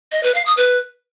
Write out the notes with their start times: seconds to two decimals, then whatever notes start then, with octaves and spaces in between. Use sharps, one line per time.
0.12 D#5
0.23 B4
0.34 F5
0.46 D#6
0.57 B4